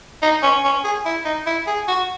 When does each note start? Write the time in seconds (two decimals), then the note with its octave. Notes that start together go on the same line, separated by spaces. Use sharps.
0.22 D#4
0.43 C#4
0.64 C#4
0.84 G#4
1.05 E4
1.25 D#4
1.46 E4
1.67 G#4
1.88 F#4